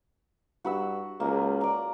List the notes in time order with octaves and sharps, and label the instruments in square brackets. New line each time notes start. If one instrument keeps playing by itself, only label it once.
[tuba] G2 [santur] F#4 B5 E6
[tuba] C#2 [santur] A#3
[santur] D5 A#5